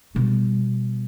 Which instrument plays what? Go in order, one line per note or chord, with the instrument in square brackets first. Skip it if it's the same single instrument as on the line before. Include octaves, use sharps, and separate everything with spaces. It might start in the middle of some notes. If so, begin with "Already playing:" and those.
[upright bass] B2 G3